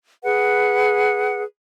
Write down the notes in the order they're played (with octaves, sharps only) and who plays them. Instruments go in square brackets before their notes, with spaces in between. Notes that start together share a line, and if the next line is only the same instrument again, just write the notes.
[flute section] G#4 B4 F#5